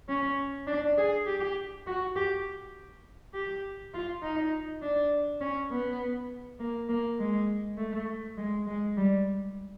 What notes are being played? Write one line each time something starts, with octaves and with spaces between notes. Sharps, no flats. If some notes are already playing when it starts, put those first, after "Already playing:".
C#4
D4
G#4
G4
F#4
G4
G4
F4
D#4
D4
C#4
B3
A#3
A#3
G#3
A3
G#3
G#3
G3